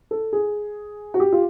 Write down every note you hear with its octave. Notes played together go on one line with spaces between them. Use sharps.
A4
G#4
F#4
G4
F4